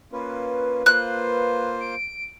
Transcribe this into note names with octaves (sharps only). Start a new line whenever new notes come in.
A#3 C#4 F4 B4
A#3 F4 C5 F#6
D7